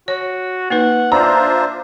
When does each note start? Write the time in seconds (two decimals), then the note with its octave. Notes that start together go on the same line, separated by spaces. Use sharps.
0.08 F#4 C#5
0.70 A#3 D#4 B4 F#5
1.12 D4 F4 C5 D5 E5 A#5